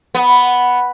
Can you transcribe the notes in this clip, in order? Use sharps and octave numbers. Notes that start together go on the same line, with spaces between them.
B3